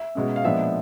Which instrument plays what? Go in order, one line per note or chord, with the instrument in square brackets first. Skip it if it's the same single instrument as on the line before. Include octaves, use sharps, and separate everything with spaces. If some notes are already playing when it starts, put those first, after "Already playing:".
Already playing: [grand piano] E5
B2 G#3 C#4
F5
A#2 F3 G#3 B3 D4 E5